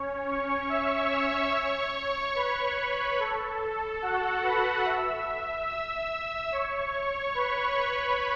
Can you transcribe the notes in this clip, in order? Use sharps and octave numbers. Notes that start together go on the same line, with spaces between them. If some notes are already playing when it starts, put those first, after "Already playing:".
Already playing: C#4 C#5
C#5 C#6
E5 E6
C#5 C#6
B4 B5
A4
F#4 F#5
B4 B5
E5 E6
E5 E6
E5 E6
C#5 C#6
B4 B5